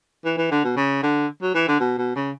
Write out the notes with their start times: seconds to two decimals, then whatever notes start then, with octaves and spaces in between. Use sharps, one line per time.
0.25 E3
0.38 E3
0.51 D3
0.64 B2
0.77 C#3
1.03 D3
1.42 F#3
1.54 E3
1.68 D3
1.80 B2
1.98 B2
2.16 C#3